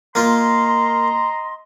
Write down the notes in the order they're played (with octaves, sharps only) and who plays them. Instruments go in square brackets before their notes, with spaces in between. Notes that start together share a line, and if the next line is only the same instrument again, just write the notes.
[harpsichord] A#3 F4 [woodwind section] D#5 A#5 C6